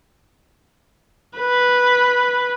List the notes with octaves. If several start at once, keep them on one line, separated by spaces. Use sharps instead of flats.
B4